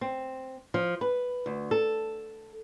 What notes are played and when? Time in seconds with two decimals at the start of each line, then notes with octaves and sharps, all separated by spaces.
0.01 C4
0.74 F3
1.01 B4
1.46 D2
1.71 A4